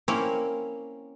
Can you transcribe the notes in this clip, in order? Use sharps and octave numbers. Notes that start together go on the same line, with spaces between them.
A#3 C4 C#4 E4 C#5